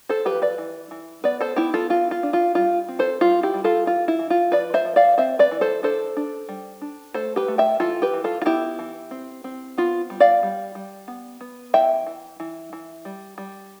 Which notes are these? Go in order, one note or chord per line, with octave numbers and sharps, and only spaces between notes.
A4 C5
F3 G4 B4
B4 D5
E3
E3
B3 B4 D5
A4 C5
B3 E4 G4
F4 A4
E3 F4
F4
D4
F4
G3 F4
C4
A4 C5
G3 F4
E4 G4
G3
F4 A4
E3 F4
E4
E3
F4
F3 B4 D5
C5 E5
F3
D5 F5
C4 C5 E5
B4 D5
E3
A4 C5
D4 A4 C5
D4
G3
D4
A3 A4 C5
G4 B4
A3
E5 G5
E3 F4 A4
G4 B4
E3
F4 A4
F4
B3 E4 G4
E3
C4
C4
B3 F4
G3
D5 F5
G3
G3
B3
B3
E3 E5 G5
E3
E3
E3
G3
G3